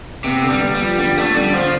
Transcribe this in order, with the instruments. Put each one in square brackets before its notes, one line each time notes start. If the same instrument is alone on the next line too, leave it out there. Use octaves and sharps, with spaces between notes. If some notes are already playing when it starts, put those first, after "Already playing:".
[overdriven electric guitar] C3 [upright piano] B3
[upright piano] D3
[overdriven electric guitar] G3
[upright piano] B3
[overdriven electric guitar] G3
[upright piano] F3
[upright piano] D3 [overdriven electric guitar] G3
[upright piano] D3 [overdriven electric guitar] A3
[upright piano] D3 [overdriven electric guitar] G3
[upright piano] D3 [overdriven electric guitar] F3